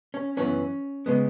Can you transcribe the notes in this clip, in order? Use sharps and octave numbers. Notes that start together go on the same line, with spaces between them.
C#4
F#2 E3 B3 C#4
C#3 G#3 B3